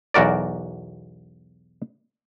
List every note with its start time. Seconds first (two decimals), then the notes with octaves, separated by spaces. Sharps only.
0.14 B1 E2 F#4 A#4 D5